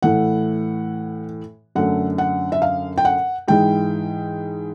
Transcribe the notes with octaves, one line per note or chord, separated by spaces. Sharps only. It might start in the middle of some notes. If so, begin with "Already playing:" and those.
A2 E3 A3 F#5
F#2 D3 F#3 A3 F#5
F#5
E5
F5
G5
F#5
G#2 E3 G#3 G5